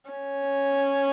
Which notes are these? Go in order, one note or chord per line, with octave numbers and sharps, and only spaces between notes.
C#4